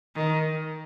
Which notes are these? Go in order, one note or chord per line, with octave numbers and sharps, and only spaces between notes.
D#3